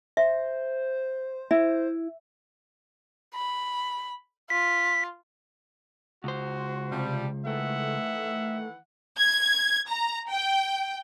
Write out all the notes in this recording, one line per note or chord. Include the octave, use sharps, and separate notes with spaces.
C5 E5
E4 E5
B5
F4 B6
C#2 F#4 C5
C3 F3 G3
D#3 E3 A3 E5 F#5
G#6
A#5
G5